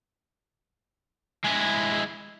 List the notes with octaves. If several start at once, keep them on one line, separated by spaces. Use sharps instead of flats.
G#3 E4